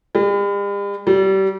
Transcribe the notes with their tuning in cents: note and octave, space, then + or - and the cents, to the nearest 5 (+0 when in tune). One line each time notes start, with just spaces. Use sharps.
G3 +45
G3 -30